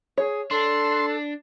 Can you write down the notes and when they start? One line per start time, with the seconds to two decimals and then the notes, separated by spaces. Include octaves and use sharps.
0.18 G#4 C#5
0.51 D4 A4 C6